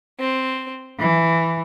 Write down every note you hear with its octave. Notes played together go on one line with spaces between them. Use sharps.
C4
E3